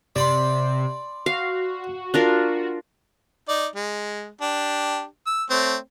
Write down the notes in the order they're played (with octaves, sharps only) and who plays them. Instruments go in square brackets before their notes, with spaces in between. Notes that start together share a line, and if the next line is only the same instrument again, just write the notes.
[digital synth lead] C3 [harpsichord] D5 B5 C6
[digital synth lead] F#4 [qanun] F5
[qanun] D4 F4 A#4
[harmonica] D#4 D5
G#3
D4 G4
E6
A3 C4 C#5